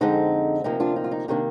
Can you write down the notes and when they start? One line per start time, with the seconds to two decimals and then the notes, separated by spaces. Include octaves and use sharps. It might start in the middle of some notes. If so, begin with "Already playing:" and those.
0.01 F2 D3 G#3 C4 D#4
0.64 D2 C3 F3 A#3 D#4
0.80 D4 F4
0.96 D#4
1.04 F4
1.11 D#4
1.28 C3 D#3 A#3 D4 D#4